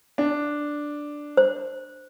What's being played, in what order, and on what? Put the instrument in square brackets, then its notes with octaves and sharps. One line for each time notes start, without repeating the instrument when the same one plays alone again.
[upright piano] D4
[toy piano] C5